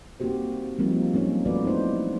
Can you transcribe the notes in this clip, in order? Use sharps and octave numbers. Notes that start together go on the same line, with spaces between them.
A#3 C4 D#4 F#4 G4 C5
F3 G3 A#3 C4 D#4 F4
F#3 A#3 C#4 D#4 C#5
E3 A3 B3 F#4 B4 D5
C4 D#4 C5